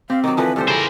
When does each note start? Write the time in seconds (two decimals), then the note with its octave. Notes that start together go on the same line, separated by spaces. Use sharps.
0.10 C4 G4 F5
0.24 D#3 F#3 D6
0.37 D3 E3 F3 B4
0.56 G2 G4 A4 C5
0.68 C#3 A#4 C5